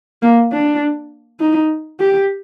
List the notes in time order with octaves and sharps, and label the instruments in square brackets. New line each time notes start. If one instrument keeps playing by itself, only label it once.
[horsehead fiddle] A#3
D4
D#4
G4